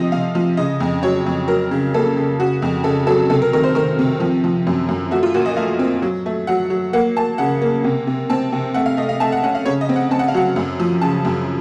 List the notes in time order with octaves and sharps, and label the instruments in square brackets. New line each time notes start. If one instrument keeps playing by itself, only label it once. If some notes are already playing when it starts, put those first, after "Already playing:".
Already playing: [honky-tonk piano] C3 F3 D#5
C3 F5
F3
C#3 D#5
F2
F#3 C#5
F2
F#3 A#4
C#3
A#3 A4
C#3
C#3 F#4
F2
C#3 A4
F#3 A4
C3 A4
A#4
D#3 A#4
C5
D#3 A#4
C3
F3
F3
F#2
F#2
A3 F#4
F4
A#2 F#4
D#5
A3 F5
C4
F#3
A3
F#3 F#5
F#3
A#3 F#5
A#3 A5
C#3 F#5
A#3
C3
C3
C4 A5
C3
A3 F#5
F5
A3 D#5
F5
A3 A5
F#5
C#4 F#5
F5
C#3 C#5
D#5
C4
F#5
C4 A5
F#5
F5
F#3 F#5
F#2
F3
C#3 A5
F#2